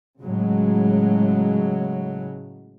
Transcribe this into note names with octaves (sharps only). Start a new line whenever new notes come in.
A2 C#3 F#3 G#3